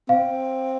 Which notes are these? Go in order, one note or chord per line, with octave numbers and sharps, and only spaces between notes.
C4 F5